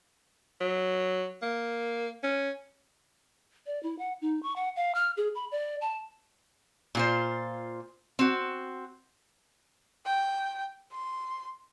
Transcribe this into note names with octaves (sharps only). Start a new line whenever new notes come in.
F#3
A#3
C#4
D5
E4
F#5
D#4
C#6
F#5
F5
F6
G#4
B5
D5
A5
A#2 F4 C5
C4 F#4
G5
C6